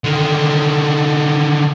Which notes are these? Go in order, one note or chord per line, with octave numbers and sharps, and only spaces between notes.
D3 D#3